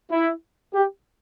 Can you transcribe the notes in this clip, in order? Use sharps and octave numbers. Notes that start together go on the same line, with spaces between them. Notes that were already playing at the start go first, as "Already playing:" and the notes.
E4
G4